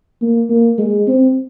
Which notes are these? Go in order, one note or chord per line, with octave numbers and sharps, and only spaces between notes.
A#3
A#3
G#3
C4